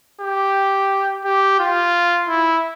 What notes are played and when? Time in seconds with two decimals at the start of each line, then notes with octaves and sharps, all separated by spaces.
0.21 G4
1.25 G4
1.59 F4
2.28 E4